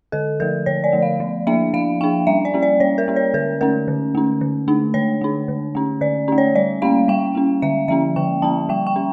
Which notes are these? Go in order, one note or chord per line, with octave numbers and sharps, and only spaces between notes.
D3 A4
F3 A3 A#4
D3 C#5
D5
F3 A3
F5
F3
A#3 D4 E5
F3 F5
A#3 D4 G5
G3 E5
D5
A#3 C#4
D5
G3 C#5
A#4
A#3 C#4
C#5
D3 A#4
A3 C#4 A#4
D3
A3 C#4
D3
A3 D4
D3 C#5
A3 D4
D3
A3 C#4
D3 D5
A3 C#4
C#5
G3 D5
A#3 C#4 F5
G3 G5
A#3 C#4
D3 E5
F3 A#3 C#4 E5
D3 G5
F3 A#3 C#4 A5
G3 G5
G5
C#4